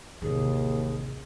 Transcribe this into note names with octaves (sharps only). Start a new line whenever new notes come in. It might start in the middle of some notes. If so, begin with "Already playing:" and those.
A1 D#2 C3 G#4